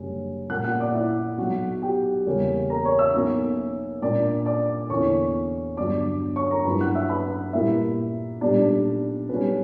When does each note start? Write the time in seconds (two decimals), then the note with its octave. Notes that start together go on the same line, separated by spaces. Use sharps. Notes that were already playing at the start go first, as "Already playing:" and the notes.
Already playing: F#1 F#2 D3 G3 C#4
0.50 A#1 A#2 A#3 F#5 F#6
0.64 F#5 F#6
0.80 D5 D6
0.94 E4 E5
1.38 B1 B2 F#3 F#4 F#5
1.82 G4 G5
2.26 E2 C#3 G3 A#3 C#4
2.70 A#4 A#5
2.85 C#5 C#6
2.99 E5 E6
3.14 B1 B2 A#3 C#4
4.02 A#2 A#3 D4 D5 D6
4.46 D5 D6
4.90 E2 D3 A#3 C#4 E4 C#5 C#6
5.77 G1 G2 F#3 B3 D4 D5 D6
6.36 C#5 C#6
6.51 A#4 A#5
6.65 G2 F#3 A#3 E4 B4 B5
6.81 F#5 F#6
6.95 E5 E6
7.09 B4 B5
7.53 A#2 G3 A#3 E4 E5
8.41 B1 A#2 G3 D4 D5
9.29 B1 B2 G3 C#4 B4